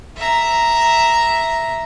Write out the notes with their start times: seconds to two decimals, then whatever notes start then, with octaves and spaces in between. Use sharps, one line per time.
0.17 E5 A#5